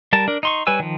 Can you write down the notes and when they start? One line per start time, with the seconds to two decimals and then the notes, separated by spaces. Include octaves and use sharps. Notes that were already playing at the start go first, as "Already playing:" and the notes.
0.13 G3 A#4 A5
0.28 D4 A#4
0.43 D#4 C6 C#6
0.67 G3 B4 C#5 G#5 E6
0.79 D#3 F3